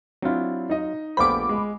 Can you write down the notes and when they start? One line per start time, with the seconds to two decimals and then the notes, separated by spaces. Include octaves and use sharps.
0.22 F#3 C4 D4 E4 F4
0.70 D#4 D#5
1.17 A#1 A3 B3 F4 G4 C5 B5 D6
1.49 G#3